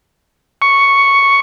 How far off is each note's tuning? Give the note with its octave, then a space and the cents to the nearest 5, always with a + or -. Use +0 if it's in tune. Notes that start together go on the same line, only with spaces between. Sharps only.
C#6 +0